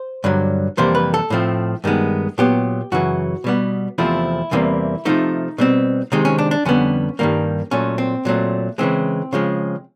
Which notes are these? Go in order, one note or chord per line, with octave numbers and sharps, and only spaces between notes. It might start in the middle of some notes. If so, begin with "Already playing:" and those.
Already playing: C5
G2 D3 F#3
F2 C3 E3 G3 A#3 C5
B4
A4
A2 F3 A3 C4
G2 D#3 G#3 B3
A#2 F#3 B3 G4
F#2 C#3 E3 F#4
B2 G3 B3
E2 C3 F3 A3 C4 E4
E2 C3 E3 G3 A#3
C3 F3 A3 D#4
B2 G3 C4
C3 D#3 G#3 C4 D#4
C#4
D4
D4
F2 D3 G3 B3 C#4
G2 D#3 G3 A#3
A#2 F#3 A3 C#4
C4
A#2 F#3 A3 C4
C#3 E3 G#3 C4
C#3 F3 G#3